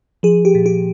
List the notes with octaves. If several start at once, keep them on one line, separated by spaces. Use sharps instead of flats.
F3 G#4
G4
A#2
G4